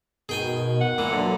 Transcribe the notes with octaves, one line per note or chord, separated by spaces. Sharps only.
B2 D#3 G#4 G5 G#5
F#5
A#2 E3
D3 F#3